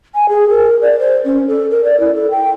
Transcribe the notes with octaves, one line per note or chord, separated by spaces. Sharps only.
G#5
G#4
A#4
D5
C5
C#4
A4
A#4
D5
E4
A4
G5